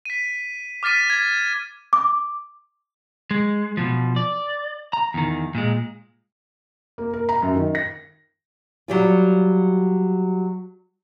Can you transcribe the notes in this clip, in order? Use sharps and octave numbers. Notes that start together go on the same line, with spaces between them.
B6 D#7
D6 F6 A6 B6 D#7
G#6
D6
G#3
B2 F3
D5
A#5
E2 D#3
A#2 G#3
A#3
A#4
A#5
F#2
D#3
A#6
F#3 G3 F4